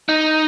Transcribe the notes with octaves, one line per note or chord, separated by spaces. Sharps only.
D#4